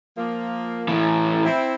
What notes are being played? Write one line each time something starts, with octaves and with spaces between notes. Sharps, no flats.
F3 A#3
A2 E3
C4 E4